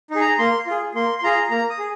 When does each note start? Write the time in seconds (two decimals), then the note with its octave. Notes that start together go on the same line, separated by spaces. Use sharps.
0.10 D#4 G#4
0.21 A#5
0.38 A#3 C6
0.67 F4 G#4
0.95 A#3 C6
1.18 C6
1.23 F4 G#4 A#5
1.51 A#3 A#5
1.70 D#6
1.79 G#4